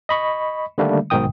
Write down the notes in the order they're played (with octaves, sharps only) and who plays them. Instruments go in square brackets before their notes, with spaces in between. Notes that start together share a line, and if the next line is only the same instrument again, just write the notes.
[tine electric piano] D#5 B5 C#6
D3 D#3 G3 A3 A#3 D4
B1 G#2 B2 D#3 G5 D#6